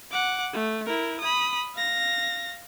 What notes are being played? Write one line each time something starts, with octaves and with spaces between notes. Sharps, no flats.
F#5 D6
A3
E4 A#4
B5 D#6
F5 A#6